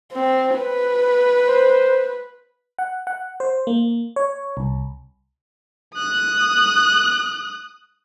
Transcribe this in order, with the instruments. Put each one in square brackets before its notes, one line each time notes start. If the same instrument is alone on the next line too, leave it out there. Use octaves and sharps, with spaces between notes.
[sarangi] C4
B4
[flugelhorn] C5
[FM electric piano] F#5
F#5
C5
A#3
C#5
C2
[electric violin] D#6 F#6